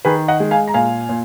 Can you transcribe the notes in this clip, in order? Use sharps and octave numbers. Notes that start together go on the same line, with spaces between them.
D#3 G#4 B4
D#5 F#5
G#3
F5 G#5
A#5
A#2 F5 G#5
A#2